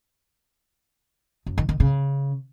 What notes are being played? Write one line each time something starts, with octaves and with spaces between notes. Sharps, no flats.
F#2
D#3
D#3
C#3